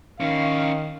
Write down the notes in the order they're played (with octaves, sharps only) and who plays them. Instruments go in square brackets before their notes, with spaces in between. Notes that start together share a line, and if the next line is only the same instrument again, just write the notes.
[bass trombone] D#3 [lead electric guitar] C#4 E4 [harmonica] F5